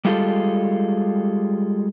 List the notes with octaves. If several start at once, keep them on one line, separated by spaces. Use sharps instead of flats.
G3 G#3 F4 G4 A4